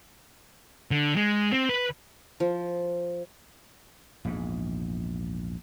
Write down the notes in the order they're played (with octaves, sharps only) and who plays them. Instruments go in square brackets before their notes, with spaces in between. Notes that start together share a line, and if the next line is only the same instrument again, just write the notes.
[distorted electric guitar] D3
G#3
C4
B4
[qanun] F3
[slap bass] A#1 E2 G#2